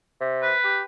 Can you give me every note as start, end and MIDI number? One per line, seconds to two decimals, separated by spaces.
0.20 0.54 48
0.42 0.81 71
0.64 0.83 67